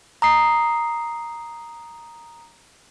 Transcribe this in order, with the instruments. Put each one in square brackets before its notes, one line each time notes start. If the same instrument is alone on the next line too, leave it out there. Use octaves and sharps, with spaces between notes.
[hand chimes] A#5 D#6 C7